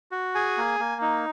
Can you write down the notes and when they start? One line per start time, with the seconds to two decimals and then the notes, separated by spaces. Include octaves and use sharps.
0.11 F#4
0.35 G#4 G#5
0.58 A#3
0.80 A#3
1.02 D#4